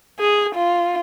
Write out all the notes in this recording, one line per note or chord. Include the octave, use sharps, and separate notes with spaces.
G#4
F4